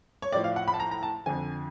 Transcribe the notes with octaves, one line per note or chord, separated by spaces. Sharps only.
C#5
A2 F3 D5
F5
F#5
B5
A5
A#5
A#5
A5
F2 D3 F3 G#5